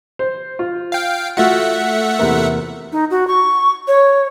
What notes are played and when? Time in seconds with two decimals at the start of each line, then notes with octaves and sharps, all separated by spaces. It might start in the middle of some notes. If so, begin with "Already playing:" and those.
0.19 C5
0.59 F4
0.92 F5 G5
1.37 A3 F4 F#4 E5 F#5
2.19 E2 C3 A#3
2.92 D#4
3.11 F#4
3.27 C#6
3.88 C#5